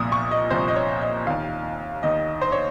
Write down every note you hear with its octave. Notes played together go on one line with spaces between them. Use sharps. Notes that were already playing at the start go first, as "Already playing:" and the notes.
Already playing: C2 A#2 F3 D#6
C#6
D#5
C2 A#2 F3 C5
D#5
C#5
D#5
D#2 D#3 F5
D#2 D#3 D#5
C5
C#5